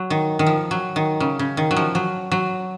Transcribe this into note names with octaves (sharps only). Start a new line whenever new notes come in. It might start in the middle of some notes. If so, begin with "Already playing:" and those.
Already playing: F#3
D#3
D#3
F3
F#3
D#3
C#3
C#3
D#3
F#3
F3
F#3
F#3